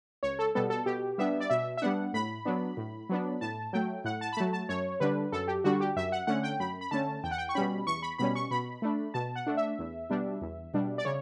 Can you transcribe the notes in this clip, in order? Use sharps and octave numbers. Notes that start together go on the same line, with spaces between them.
C#2 C#5
A4
B2 G3 B3 A4
A4
B2 G4
G3 B3 D4 E5
D5
B2 E5
E5
G3 B3 D4 F#5
A2 B5
F#3 B3 D4
A2
F#3 B3 D4
A2 A5
F#3 A3 G5
A2 F#5
A5
B5
F#3 A3 A5
A5
F#2 C#5
D3 G3 D4 B4
F#2 A4
G4
D3 G3 D4 F#4
G4
F#2 E5
F#5
D3 A3 C#4 F#5
G5
F#2 B5
B5
D3 A3 C#4 A5
E2 G5
F#5
G5
C#6
B2 G3 C#4 B5
E2 C#6
B5
B2 G3 C#4 B5
C#6
B2 B5
A3 D4
B2 A5
F#5
A3 D4
E5
E2
B2 G3 D4
E2
B2 G3 D4
D5
C#3 C#5